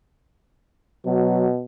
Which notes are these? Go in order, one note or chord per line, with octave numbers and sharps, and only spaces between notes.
B2 F#3